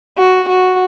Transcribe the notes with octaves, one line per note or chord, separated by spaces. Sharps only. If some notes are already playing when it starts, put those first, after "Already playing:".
F#4
F#4